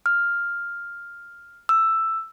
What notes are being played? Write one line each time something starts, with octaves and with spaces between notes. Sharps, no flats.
F6
E6